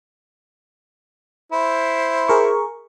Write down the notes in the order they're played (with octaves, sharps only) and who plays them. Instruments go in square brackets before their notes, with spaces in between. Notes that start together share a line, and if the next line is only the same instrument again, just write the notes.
[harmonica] E4 C5
[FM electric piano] G#4 A#4 C#6